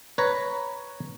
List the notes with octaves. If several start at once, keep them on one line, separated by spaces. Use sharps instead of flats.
B4 C#5 A#5